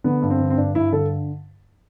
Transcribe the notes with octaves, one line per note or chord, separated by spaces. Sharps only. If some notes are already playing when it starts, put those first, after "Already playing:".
D3 B3
G2
C4
D3
C4
G2 D4
G2 E4
D3 A4